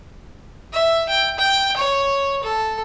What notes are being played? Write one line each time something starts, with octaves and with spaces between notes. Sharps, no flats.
E5
G5
G5
C#5
A4